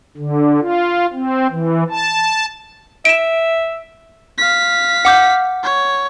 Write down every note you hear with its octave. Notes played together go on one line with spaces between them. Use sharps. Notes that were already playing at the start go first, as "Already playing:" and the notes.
D3
F4
C4
E3
A5
E5 D7 E7
F5 B6
F#5 D6 G6
C#5